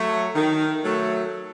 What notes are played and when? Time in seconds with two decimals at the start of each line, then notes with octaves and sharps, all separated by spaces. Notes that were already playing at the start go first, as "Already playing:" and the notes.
Already playing: F#3 A3
0.35 D#3
0.84 F#3 A3